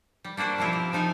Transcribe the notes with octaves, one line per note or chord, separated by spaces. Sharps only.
G3
G3 A#3 D4 F#4 C5
B2 F3 C4 E4 G4
A#4
C3 F3 D#4 A4 G#5